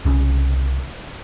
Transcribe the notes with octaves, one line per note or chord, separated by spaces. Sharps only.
C2 C#3